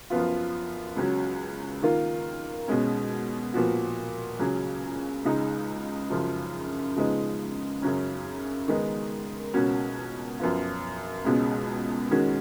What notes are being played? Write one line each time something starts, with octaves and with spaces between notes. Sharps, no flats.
F#2 F3 B3 F4
C#2 C#3 F#3 C#4 F#4
D#3 A#3 F4
B2 G#3 C#4
A#2 F3 B3 F#4
C#2 C#3 F#3 C#4 G#4
C#2 C#3 G#3 D#4
F#2 C#3 F3
C#3 F3 G#3 B3 D#4
F#2 C#3 F#3 C#4
D#3 G#3 B3 D#4
C#2 B2 A#3 C#4 F#4
F#2 F3 B3 F4
C#2 B2 G#3 C#4
D#3 G#3 C#4 F#4